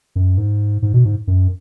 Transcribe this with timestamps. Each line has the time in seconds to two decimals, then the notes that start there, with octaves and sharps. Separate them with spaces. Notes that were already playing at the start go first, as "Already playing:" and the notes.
0.16 F#2
0.38 G#2
0.82 G#2
0.94 B2
1.05 G#2
1.27 F#2